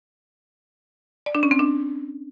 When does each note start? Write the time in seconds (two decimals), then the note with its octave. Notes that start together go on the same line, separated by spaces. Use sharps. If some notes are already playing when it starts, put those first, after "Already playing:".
1.26 D5
1.35 D4
1.43 C#4
1.51 C4
1.59 D4